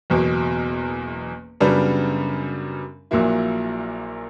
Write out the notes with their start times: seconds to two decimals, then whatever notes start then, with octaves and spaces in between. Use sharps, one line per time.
0.10 F#1 E2 B2
1.60 F#2 C#3 G3 B3 D4
3.11 A#1 A#2 F#3 A#3 E4